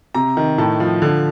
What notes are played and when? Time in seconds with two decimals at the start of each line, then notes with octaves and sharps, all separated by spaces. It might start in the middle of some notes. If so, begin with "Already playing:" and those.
0.15 C3 A#5
0.37 D#3
0.58 A2 A5
0.80 F3
1.02 D3